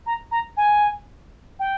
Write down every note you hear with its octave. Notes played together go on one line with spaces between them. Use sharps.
A#5
A#5
G#5
G5